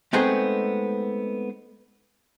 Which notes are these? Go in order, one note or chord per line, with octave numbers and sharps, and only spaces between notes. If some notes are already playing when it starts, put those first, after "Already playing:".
G#3 A3 B3 C4 D#4 G#4